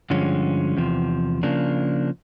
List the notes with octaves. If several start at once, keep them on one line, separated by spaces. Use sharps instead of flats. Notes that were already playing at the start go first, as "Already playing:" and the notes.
G2 D3 F3 G#3 C#4
E2 C3 F3
C#3 F3 A#3 D4